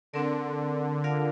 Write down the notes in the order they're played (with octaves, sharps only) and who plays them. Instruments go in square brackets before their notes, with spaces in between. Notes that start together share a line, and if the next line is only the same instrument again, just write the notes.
[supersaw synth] D3 [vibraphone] C4 A#4 D5
[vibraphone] F4 A#4 D5 F5